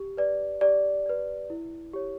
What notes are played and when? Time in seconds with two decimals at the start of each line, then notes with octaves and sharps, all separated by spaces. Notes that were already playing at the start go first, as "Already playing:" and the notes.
Already playing: G4
0.17 B4 D5
0.61 G4 D5
1.06 B4 D5
1.50 E4
1.93 G4 C#5